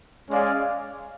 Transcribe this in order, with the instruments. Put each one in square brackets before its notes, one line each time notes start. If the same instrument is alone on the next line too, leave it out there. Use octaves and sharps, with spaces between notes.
[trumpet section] G#3 C#4 G#4 D5 F5